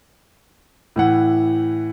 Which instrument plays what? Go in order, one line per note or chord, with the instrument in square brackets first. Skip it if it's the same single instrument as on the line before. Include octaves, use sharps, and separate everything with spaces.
[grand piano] A2 E3 F#5